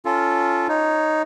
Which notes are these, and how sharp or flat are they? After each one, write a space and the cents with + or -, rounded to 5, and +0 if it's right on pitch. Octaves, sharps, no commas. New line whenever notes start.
C#4 +10 F4 -5 A4 +0
D#4 +0 C#5 +0